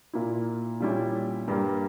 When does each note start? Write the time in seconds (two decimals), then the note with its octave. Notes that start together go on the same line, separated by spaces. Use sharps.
0.13 A#2 A#3 E4
0.80 A#2 G3 C#4 E4
1.48 G2 G3 A#3